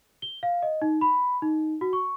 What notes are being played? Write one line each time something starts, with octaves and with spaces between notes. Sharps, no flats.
G7
F5
D#5
D#4
B5
D#4
F#4
C#6